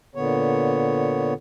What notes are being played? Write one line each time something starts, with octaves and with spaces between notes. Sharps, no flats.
A#2 D3 B3 C#5